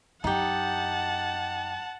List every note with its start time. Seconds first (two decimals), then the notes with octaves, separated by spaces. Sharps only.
0.24 F#2 D#4 G4 F#5 A5